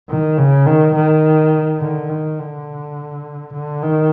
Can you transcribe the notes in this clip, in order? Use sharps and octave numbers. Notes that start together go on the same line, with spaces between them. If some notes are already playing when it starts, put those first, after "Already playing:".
D#3
C#3
D#3
D#3
D3
D#3
D3
D3
D#3